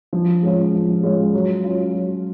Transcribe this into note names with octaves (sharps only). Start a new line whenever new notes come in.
F3
G#3 C#4 F4
F3
G#3 C#4 F4
F#3
C#4 F4
F#3